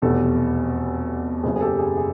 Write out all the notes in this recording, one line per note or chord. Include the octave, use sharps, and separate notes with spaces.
F1 E2 B2 G4 A4
F#1 F#2 C#3 G#4
G#4
G4 A4
G#4
G#4